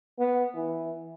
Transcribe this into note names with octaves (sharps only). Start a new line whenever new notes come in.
B3
E3